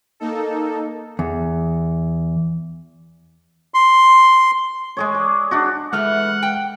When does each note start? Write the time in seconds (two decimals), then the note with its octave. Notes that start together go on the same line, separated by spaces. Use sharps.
0.20 A#3 D#4 A4
1.19 E2
3.74 C6
4.97 G#3 G#4 C#5
5.15 D5
5.51 D4 D#4 F#4
5.93 E3 G#3 A3 B3 F#5 F6
6.43 G5